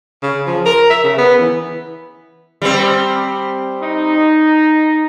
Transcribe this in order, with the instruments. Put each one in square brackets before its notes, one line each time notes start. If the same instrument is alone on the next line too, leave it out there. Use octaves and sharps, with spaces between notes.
[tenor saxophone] C#3
F3
A#4
E5
C#3
B3
E3
[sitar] G3 C4
[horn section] D#4